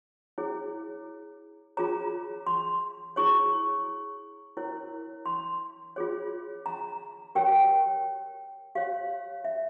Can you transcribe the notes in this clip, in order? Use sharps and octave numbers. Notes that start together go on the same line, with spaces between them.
E4 G#4 C#5
F4 G#4 C#5 A#5
C6
E4 G#4 C#5 C#6
E4 A#4 C#5
C6
F4 G#4 C#5
A#5
G4 A#4 C#5 G5
G4 C#5 F5
E5